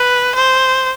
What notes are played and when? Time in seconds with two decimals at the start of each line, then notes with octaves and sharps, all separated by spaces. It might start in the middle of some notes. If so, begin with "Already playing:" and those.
Already playing: B4
0.35 C5